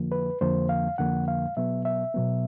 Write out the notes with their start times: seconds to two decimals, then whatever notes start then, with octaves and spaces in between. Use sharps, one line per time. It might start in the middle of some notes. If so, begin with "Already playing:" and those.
Already playing: F2 D3 F3 A#3
0.12 B4
0.41 F2 D3 F3 A#3 C5
0.69 F5
0.98 F2 D3 F3 A#3 F#5
1.28 F5
1.57 B2 F#3 B3 E5
1.85 E5
2.14 B2 F#3 B3